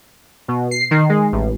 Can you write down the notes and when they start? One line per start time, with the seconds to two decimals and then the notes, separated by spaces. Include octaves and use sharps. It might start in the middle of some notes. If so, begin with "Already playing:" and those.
0.48 B2
0.71 C7
0.91 D#3
1.09 G#3
1.33 A1